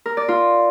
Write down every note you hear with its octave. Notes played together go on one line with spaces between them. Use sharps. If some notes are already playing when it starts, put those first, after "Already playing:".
A#4
D5
F4